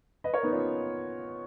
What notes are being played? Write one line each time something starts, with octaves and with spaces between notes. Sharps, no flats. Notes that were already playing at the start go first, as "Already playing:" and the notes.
B4 D#5
A#4 C#5
B3 D#4
C#4 F4